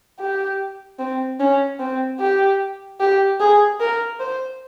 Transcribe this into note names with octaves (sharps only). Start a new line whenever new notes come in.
G4
C4
C#4
C4
G4
G4
G#4
A#4
C5